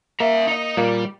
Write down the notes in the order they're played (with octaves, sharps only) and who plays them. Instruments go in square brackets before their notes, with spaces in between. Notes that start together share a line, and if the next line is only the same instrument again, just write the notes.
[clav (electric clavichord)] A#3 [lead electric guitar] A#4 E5
[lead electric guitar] D#4 D#5
[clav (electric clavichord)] A#2 A#3 [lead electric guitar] G3